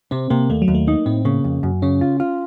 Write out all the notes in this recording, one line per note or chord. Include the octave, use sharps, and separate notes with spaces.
C3 C4
C3 A#3
D#2 A3
F#3
D#2
A3
A#3 D#4
A2 C4
C#3 A#3
F2
F#2
C#3 C#4
F4
F4